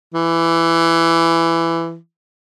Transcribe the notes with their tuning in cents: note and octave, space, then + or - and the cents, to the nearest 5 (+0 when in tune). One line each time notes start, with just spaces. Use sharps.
E3 +15